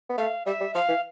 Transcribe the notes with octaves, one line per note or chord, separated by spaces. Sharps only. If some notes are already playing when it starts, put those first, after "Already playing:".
B3
A3 F5
G3 E5
G3
F3 F5
E3